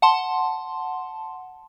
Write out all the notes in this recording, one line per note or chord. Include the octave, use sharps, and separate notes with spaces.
F#5 A5 C6